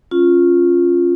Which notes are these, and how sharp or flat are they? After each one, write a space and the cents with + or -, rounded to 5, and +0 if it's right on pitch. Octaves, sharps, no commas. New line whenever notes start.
C#4 -15 F4 +0